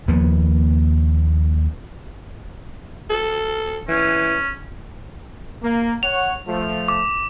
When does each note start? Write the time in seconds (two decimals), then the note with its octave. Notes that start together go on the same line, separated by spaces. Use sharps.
0.08 D#2 F3 A#3 B3
3.10 A4
3.89 E3 C#4
5.62 A#3
6.03 C#5 F#5 F7
6.47 F3 A3
6.88 D6